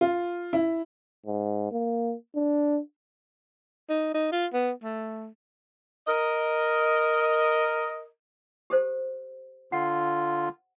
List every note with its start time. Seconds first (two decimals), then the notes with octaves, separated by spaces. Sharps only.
0.01 F4
0.53 E4
1.26 G#2
1.71 A#3
2.35 D4
3.89 D#4
4.14 D#4
4.32 F4
4.53 B3
4.83 A3
6.08 A#4 D#5
8.70 G4 A4 C5
9.72 D3 F4 F#5